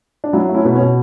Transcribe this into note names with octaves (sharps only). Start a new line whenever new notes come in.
D4
F#3 C#4 E4
A3
C#4 E4
B2 B3
C#4
B2